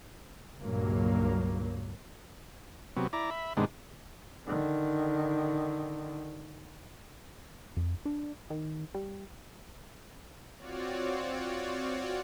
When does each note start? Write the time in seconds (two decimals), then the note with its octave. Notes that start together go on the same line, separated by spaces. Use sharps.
0.59 C#2 G2 A#2 F#3 A#3
2.97 C3 F#3 B3
3.13 E4 D5 A#5
3.31 E5 B5
3.57 G#2 C3 D#3 G#3 B3 D4
4.47 D3 D#3
7.77 F2
8.06 D4
8.50 D#3
8.95 G3
10.57 C4 F4 F#4 C#5 D5